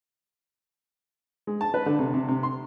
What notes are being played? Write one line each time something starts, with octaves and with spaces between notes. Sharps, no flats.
G#3
A5
B4
D3
C3
C3
C3
C6